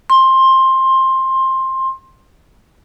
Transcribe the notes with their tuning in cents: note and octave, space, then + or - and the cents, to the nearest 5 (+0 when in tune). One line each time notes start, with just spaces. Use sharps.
C6 +15